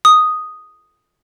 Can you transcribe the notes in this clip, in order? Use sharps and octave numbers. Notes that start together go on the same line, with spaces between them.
D#6